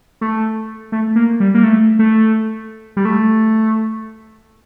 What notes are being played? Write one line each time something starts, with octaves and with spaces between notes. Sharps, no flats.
A3
A3
A#3
G3
A#3
A3
A3
G3
A3